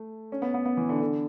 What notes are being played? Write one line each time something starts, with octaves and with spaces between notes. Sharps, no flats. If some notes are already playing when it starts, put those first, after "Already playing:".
Already playing: A3
C#4
B3
B3
B3
E3
D3
D3